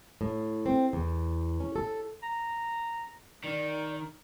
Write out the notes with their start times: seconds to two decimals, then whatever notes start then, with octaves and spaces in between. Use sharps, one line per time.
0.21 A2
0.66 C4
0.93 E2
1.60 C#4
1.76 A4
2.23 A#5
3.44 D#3 D5